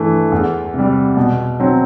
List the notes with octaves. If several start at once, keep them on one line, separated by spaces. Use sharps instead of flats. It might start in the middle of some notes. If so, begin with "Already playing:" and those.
Already playing: G2 E3 A3
E2
C3 G3
B2
F#3 C4